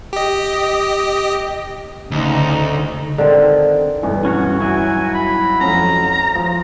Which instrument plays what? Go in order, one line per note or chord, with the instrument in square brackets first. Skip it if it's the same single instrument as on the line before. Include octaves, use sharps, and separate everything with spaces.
[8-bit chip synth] G4 D#5
[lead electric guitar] D2 [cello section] C#3 D#4
[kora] D3 D#3 C4
[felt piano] B1 G2 E3
[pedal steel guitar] C#4 F#4 C#5
[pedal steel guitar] F#3 E4 F#4 [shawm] G#5
[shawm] B5
[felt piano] F2 F3 C#4 [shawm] A#5
[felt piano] F3